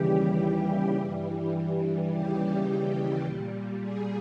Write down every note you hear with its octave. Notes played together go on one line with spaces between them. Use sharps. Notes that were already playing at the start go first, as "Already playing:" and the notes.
Already playing: D#2 C#3 E3 G3 G4
G2 E3 G3
D#2 C#3 E3 G3 G4
G4
A#2 G3
G#4